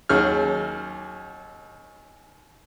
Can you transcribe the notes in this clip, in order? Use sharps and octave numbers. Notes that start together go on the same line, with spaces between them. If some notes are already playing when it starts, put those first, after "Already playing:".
D#2 F#3 C#4 G#4 F6